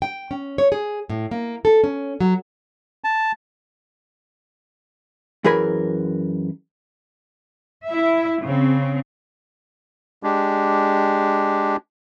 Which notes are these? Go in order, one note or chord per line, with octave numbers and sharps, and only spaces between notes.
G5
C#4
C#5
G#4
A2
A#3
A4
C#4
F#3
A5
F#2 E3 G#4 A#4 G#5 B5
E4 E5
C#3 C4
G#3 D4 G4